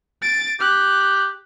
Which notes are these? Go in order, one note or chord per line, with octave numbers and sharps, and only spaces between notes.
A6 D7
G4 F#6